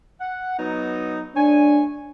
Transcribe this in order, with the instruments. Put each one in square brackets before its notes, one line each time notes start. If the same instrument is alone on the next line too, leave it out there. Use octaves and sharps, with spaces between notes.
[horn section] F#5
F#3 B3 D#4
[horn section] A3 C#5 G#5 [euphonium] D4